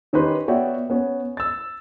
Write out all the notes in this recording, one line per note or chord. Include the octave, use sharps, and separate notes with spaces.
D#3 C#4 D#4 G4 B4 C6
B3 F#4 C#5 D5 E5 G5
B3 C#4 C#5
E6 A6